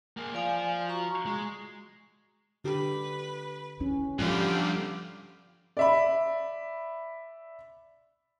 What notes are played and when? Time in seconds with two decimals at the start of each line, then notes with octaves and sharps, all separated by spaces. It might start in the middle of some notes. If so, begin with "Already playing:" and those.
0.17 A#3 G#4
0.34 F3 F4 D5 F5 G#5
0.88 F#4 A#5 C#6
1.26 G#3
2.64 D3 G4 B4
3.80 C#4 E4
4.19 G2 D3 F3 G3 G4 F5
5.77 D5 E5 B5